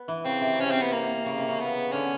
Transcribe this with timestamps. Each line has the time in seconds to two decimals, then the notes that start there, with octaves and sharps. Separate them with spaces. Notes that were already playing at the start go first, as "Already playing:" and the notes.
Already playing: B3
0.08 E3
0.25 C#3 C4
0.41 C3
0.52 C#3
0.60 C3 C#4
0.71 C4
0.82 B3
0.92 A#3
1.26 C#3
1.37 C3
1.48 C#3
1.60 B3
1.93 D3 C#4